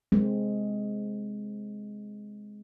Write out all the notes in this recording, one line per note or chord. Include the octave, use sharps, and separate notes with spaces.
G#3 C4